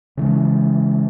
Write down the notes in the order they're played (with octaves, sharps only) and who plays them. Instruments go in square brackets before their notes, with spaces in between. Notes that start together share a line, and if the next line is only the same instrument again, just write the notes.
[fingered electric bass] C#3 E3 G#3